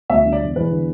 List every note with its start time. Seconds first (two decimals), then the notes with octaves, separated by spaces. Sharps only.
0.09 D2 E5
0.25 D3
0.32 D5
0.41 E1
0.56 E2 B4
0.71 D3